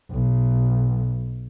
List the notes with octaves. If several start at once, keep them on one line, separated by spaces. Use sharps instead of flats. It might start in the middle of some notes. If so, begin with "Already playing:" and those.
B1